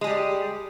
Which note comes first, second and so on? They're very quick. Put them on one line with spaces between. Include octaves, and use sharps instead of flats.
G#3 G#4 G3 G4